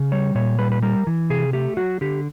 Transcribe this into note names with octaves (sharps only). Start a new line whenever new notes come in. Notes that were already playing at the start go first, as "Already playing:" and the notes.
Already playing: C#3
G3 C#5
A#2 C#5
G3 B4
B4
G3 A#4
E3
C3 G#4
A3 G4
F#3 F#4
D3 G4